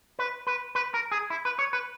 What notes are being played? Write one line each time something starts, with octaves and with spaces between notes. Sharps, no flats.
B4
B4
B4
A#4
G#4
E4
B4
C#5
B4